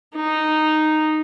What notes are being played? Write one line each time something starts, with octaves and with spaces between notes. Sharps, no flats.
D#4